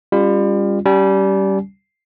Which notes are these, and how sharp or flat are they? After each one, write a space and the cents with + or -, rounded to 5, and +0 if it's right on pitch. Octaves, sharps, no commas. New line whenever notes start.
G3 +30 C#4 +0 F4 +0
G3 -15 C#4 +20 G#5 +40